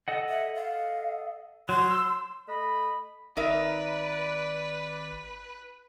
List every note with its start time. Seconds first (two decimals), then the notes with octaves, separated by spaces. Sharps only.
0.08 A4 D#5 F#5
0.29 E5
0.55 F5
1.69 F#3 C6
1.91 E6
2.48 A3 D#5 B5
3.37 G#1 D#4 A#4 B4 D5 E5